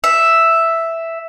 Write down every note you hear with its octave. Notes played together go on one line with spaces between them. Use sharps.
E5